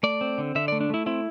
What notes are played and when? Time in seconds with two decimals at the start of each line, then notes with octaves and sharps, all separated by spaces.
0.03 A3 D5
0.21 C4
0.38 D3
0.55 D3 E5
0.68 D5
0.72 A3
0.81 D4
0.90 A3 E4
1.06 C4 E4